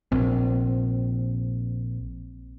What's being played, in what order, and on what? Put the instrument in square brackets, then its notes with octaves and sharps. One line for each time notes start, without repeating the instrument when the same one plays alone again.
[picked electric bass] A#1 [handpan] C4